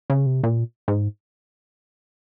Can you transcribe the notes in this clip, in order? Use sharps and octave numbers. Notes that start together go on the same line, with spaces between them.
C#3
C3
A#2
G#2